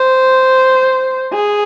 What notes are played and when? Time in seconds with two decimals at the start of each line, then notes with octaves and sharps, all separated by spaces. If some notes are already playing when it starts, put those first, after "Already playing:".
Already playing: C5
1.33 G#4